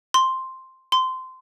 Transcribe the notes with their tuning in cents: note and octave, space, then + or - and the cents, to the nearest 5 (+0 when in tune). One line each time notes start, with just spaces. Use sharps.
C6 +0
C6 -15